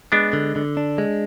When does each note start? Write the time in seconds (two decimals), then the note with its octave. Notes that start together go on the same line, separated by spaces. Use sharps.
0.12 G#3 B3 D4
0.33 D3
0.56 D3
0.77 D4
0.98 G#3